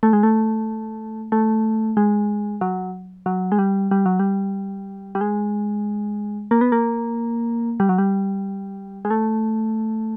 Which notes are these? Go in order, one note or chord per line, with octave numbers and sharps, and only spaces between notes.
A3
G#3
A3
A3
G#3
F#3
F#3
G#3
G3
G3
F#3
G3
G3
G#3
A#3
B3
A#3
G3
F#3
G3
G#3
A3